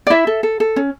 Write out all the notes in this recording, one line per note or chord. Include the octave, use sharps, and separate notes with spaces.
D5
E4 E5
A4
A4
A4
C#4